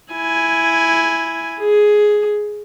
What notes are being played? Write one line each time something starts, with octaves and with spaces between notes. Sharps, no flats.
E4 G#5
G#4